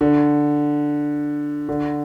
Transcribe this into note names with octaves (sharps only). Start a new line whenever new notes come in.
D3
D3